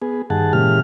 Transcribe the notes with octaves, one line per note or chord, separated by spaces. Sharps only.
B3 G#4
G2 D#3 G#4 F#5 A5
A#2 C#3 E3 G#3 G4 F6